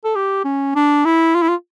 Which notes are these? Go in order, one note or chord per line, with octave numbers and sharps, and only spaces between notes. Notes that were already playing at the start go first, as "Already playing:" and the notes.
A4
G4
C#4
D4
E4
F4
E4
F4